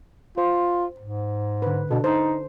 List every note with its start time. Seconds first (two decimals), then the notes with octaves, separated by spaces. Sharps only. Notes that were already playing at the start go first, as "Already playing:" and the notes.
0.38 F4 C5
1.00 G#2
1.62 D3 B4
1.91 B2 D4 A4
2.04 D#4 C5